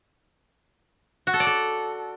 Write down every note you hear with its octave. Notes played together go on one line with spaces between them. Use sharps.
F#4
A4
D5
A4